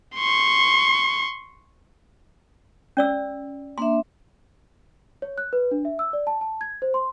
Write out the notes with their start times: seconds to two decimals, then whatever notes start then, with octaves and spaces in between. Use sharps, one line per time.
0.16 C6 C#6
2.97 C#4 D5 E6
3.78 A#3 D4 E5 C6
5.22 C#5
5.38 F#6
5.53 B4
5.71 D4
5.85 E5
5.99 E6
6.13 D5
6.27 A5
6.41 A5
6.61 G#6
6.82 C5
6.94 C6